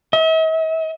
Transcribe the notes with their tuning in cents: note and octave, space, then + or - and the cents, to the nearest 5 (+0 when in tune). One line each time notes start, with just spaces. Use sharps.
E5 -45